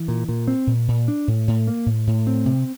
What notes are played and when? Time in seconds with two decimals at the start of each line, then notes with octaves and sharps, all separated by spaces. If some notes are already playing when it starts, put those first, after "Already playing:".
Already playing: E3
0.08 A#2
0.29 A#2
0.48 C4
0.67 A#2
0.88 A#2
1.08 D4
1.28 A2
1.48 A2
1.67 A#3
1.86 A2
2.07 A2
2.27 C4
2.46 C3